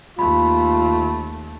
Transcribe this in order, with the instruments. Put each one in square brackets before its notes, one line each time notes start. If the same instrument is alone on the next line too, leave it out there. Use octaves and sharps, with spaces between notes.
[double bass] D#2 A3 [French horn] F4 [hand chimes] B5